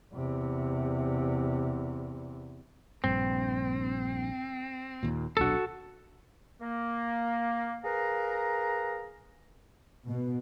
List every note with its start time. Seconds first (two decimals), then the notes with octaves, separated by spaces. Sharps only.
0.14 E2 C3
3.04 A#1 G2 C4
5.03 D#2 A#2
5.37 D#1 B1 D4 F#4 A4
6.61 A#3
7.84 G#4 A#4 B4 F5 A#5
10.08 B2